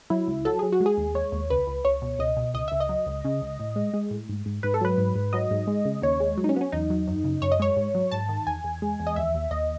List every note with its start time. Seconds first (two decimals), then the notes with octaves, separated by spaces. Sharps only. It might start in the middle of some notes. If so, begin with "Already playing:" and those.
0.10 F#3 E4
0.27 C#2
0.45 F#3 A4
0.59 F#3 G#4
0.72 F#4
0.81 G#3
0.86 G#4
0.97 D#2
1.15 G#3 C#5
1.32 D#2
1.50 C#2 B4
1.67 C#2
1.85 C#2 C#5
2.02 B2
2.19 C#2 D#5
2.37 B2
2.54 C#2 D#5
2.68 C#2 E5
2.80 D#5
2.89 F#3
3.06 C#2
3.25 C#3
3.42 C#2
3.59 A2
3.76 G#3
3.94 G#3
4.11 A2
4.29 G#2
4.46 G#2
4.63 G#2 B4
4.74 A4
4.81 F#3 B4
4.98 G#2
5.15 G#2
5.33 F#3 D#5
5.51 G#2
5.67 G#3
5.85 C#3
6.02 D#2 C#5
6.20 G#3
6.37 F#3
6.44 D#4
6.49 C#4
6.54 F#3 B3
6.61 C#4
6.72 E2 D#4
6.90 F#3
7.07 F#2
7.24 C#3
7.42 F#2 C#5
7.52 D#5
7.59 G#3 C#5
7.76 G#2
7.95 F#3
8.11 G#2 A5
8.29 D#3
8.47 E2 G#5
8.64 E2
8.82 G#3
9.00 E2
9.07 D#5
9.16 D#2 E5
9.34 D#2
9.51 D#2 D#5